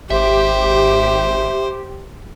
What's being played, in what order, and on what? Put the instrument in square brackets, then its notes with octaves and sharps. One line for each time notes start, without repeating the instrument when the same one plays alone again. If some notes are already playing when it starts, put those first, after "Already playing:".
[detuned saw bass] G#1 [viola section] G4 [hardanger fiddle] C5 [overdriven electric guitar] E5